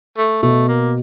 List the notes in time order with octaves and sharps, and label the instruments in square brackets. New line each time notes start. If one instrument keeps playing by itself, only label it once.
[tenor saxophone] A3
[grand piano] B2 [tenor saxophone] A3
[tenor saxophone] A#3